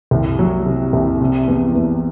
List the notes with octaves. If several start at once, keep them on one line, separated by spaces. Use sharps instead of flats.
C2
F#3
C3
C2
C3
E2
E2